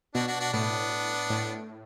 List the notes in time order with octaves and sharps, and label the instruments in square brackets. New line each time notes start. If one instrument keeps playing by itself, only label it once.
[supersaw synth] B2 [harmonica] D4 F#4
[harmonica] D4 F#4
D4 F#4
[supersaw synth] A2 [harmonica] B3 D4
[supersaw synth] A2